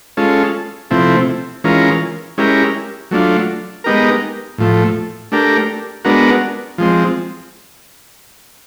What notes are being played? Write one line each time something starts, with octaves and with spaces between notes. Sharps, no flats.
G#3 C#4 F4 A4
C3 F3 A3 C4 E4
E3 G#3 C#4 F4 A#4
G#3 C#4 E4 G4 A#4
F#3 A3 D4 F4
G#3 B3 D#4 G4 A#4
A2 F3 A3
A3 D4 G4 A#4
G#3 B3 D4 F#4 A#4
F3 G#3 C4